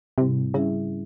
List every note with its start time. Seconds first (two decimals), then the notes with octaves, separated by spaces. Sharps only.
0.18 G#2 C3 G3 C4 E4
0.54 C#3 G3 C#4 E4 G#4 E5